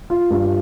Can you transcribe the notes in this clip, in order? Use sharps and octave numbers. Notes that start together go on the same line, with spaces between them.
F4
G2